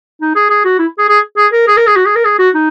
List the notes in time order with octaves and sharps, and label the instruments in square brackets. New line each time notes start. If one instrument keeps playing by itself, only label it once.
[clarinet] D#4
G#4
G#4
F#4
E4
G#4
G#4
G#4
A#4
G#4
A#4
G#4
F#4
G#4
A#4
G#4
F#4
D#4